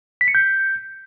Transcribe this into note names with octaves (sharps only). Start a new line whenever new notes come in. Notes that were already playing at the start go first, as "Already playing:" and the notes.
B6
C#7
G6